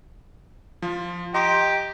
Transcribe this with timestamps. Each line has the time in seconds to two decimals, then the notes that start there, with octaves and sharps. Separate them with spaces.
0.82 F3 F4
1.34 G4 D#5 A#5 C6